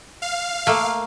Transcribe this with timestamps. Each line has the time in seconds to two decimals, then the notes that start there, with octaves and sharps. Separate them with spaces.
0.22 F5
0.67 A3 A#3